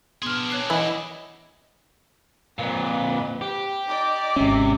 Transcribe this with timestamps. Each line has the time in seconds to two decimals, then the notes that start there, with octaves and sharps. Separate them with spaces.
0.22 B3 D4 G#4 C6 F6
0.50 C#5 F#6 C7
0.70 E3 D#5 E5 F#5
2.59 F2 A#2 C4 B4
3.41 G4
3.88 D#4 D5 D6
4.36 G#1 C3 C#4